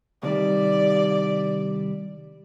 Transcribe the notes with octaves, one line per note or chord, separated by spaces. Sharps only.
C2 D#3 G3 D5